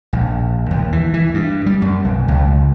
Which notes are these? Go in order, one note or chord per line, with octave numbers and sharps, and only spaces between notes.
A#1
D#2
E3
E3
G2
G3
F#2
B1
C#2